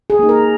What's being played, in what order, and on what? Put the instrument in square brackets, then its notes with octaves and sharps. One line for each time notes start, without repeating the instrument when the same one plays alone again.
[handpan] G#4
A#3 D#4
A#4